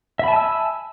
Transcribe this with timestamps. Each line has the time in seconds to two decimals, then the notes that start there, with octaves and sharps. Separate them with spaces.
0.19 E5
0.24 B5
0.28 A5
0.32 G#5
0.36 E6